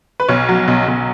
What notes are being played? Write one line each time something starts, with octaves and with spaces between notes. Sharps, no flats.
B4
B1 C#5
F#3
B1
B1